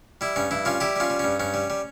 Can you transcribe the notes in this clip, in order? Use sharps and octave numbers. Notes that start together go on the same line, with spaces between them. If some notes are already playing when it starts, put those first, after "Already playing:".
G3 E4
G2 C#4
G2 E4
G3 C#4 F4
G3 E4 G4
G3 C#4 F4
G3
G2 C#4
G2 C#4
G3
G3